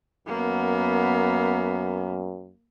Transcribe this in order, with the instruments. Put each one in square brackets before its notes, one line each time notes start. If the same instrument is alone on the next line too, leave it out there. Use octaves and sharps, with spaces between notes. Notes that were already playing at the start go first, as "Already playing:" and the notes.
[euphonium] F#2 [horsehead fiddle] A#3 B3